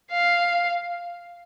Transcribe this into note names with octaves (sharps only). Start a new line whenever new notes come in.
F5